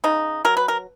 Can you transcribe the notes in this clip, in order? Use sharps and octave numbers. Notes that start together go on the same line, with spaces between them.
C#3 D#4
F#3 A#4
B4
A#4